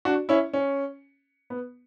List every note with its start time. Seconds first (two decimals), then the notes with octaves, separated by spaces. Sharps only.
0.05 D4 F#4
0.29 C#4 E4
0.54 C#4
1.50 B3